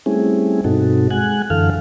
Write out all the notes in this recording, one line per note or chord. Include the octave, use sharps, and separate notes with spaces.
G3 A3 C4 C#4 E4 G#4
G2 B2 C4 D#4 F#4 A4
G#3 F#5 G#5 F#6
F#2 D3 E3 A4 F5 F6